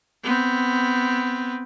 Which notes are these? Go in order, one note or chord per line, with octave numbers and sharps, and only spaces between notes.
B3 C4